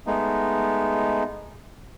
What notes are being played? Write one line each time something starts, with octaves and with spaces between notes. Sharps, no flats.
G#3 A3 B3 D#4